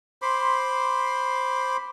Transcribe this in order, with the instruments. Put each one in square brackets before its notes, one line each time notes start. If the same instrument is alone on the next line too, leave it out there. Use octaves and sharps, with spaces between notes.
[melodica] C5 B5 C6 D6